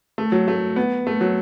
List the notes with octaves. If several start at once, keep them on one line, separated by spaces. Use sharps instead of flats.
A3
F#3
A3
B3
A3
F#3